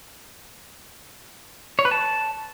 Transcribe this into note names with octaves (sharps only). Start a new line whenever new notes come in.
C#5
B4
A5